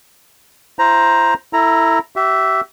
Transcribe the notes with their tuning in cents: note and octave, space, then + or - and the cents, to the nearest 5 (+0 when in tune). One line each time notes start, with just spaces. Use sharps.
E4 +40 C5 +0 A#5 +10
E4 +0 A4 +25 A#5 +0
G4 -40 E5 +0